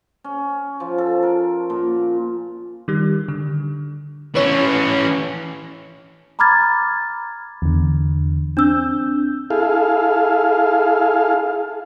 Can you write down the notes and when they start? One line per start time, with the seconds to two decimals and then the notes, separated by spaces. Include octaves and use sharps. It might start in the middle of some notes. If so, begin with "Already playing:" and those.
0.24 C#4
0.80 F3
0.98 A4
1.23 A#4
1.70 A#2
2.88 D#3 G3
3.28 D3
4.35 E3 C#4 B4 C#5
6.39 A#5 B5 D6 F6 G#6 A6
7.62 E2 D3
8.57 C4 D4 E6 G6
9.50 E4 G#4 A4 F5